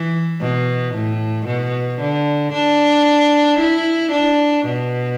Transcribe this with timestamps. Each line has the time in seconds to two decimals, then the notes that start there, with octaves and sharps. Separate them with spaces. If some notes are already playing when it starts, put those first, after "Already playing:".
Already playing: E3
0.41 B2
0.95 A2
1.47 B2
2.01 D3
2.53 D4
3.60 E4
4.13 D4
4.66 B2